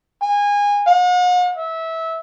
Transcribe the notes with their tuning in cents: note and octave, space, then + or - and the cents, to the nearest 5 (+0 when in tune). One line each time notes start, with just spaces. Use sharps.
G#5 -25
F#5 -45
E5 -20